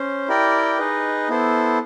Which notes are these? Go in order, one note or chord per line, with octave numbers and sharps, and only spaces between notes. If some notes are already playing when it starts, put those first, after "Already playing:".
Already playing: C#4 C5
E4 G4 A#4 D5 G5
D#4 G#4 B4 D#5
B3 E4 A4 C5